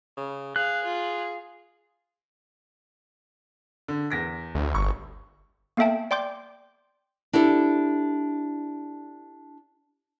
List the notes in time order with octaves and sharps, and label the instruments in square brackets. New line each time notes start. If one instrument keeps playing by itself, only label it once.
[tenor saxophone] C#3
[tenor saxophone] G#4 [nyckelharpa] F5 [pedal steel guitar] F#6
[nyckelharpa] F4
[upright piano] D3
E2 A#6 B6
[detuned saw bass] D2
[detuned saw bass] G1 [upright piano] C#6
[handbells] A#3 B3 A4 E5 G5 A5
D5 G5 C6 D6 G6
[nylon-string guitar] D4 E4 G4 A4